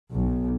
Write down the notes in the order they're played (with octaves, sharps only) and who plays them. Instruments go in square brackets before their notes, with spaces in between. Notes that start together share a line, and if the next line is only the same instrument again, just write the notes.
[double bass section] B1